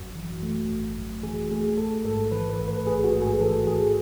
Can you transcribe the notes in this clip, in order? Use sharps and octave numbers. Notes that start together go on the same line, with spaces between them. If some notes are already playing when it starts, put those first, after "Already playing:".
Already playing: G#1 F#2 F#4
E3
A3
G#1
F#2
E3 G#4
A3 G#4
A1 A4
G#2 A4
E3 B4
B4
A1
B4
A1 G#4
F#4
G#2
G#4
E3 A4
A1 G#4